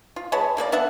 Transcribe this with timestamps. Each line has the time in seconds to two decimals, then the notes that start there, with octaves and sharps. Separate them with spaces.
0.16 F4
0.32 G#3 B4 C#5 A5
0.57 E3 A#3 B4 D5
0.72 B3 D4 E5 F#5